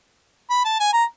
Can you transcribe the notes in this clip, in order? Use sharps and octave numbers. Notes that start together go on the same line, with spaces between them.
B5
A5
G#5
A#5